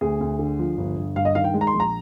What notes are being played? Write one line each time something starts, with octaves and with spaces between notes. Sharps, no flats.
D2 G#4
D2
D3
F3
G1
G1
G2 F5
D#5
D#3 F5
G5
G#3
A#5
C6
A#1
A#5